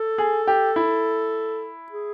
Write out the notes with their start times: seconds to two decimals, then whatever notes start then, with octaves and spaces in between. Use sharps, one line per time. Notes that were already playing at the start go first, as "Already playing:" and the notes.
Already playing: A4
0.18 G#4
0.47 G4
0.76 E4
1.92 G#4